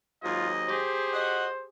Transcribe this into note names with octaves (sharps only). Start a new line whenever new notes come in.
D#2 G#2 F#3 F4 D#5
G4 G#4 C5
F#4 D#5 F#5